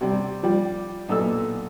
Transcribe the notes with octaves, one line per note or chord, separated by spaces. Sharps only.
C3 G3
F3 G3
B1 A#2 A4 E6